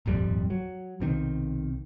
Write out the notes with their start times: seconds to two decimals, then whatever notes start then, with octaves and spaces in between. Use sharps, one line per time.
0.06 D#1 G#1 F2 G3
0.50 F#3
1.00 B1 C3 D#3